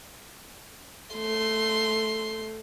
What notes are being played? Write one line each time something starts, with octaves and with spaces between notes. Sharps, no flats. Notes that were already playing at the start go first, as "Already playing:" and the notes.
A3 C6